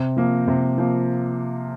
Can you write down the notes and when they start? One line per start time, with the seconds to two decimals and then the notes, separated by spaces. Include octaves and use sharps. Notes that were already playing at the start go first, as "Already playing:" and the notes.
Already playing: C3
0.17 F3 A#3
0.48 C3
0.78 F3 A#3